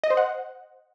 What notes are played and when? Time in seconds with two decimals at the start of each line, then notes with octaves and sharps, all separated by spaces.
0.04 D#5
0.10 C5
0.17 F#5